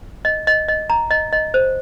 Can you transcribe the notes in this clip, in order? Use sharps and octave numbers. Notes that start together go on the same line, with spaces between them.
D#5
D#5
D#5
A#5
D#5
D#5
C5